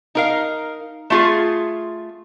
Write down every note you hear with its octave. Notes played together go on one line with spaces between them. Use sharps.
D#4 A#4 F5
A3 F4 G#4